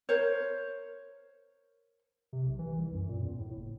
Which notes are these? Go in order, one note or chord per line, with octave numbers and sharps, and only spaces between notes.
A#4 C5 C#5
C3
B1
E3
C2
F#2
A#2
E2
A2
F#1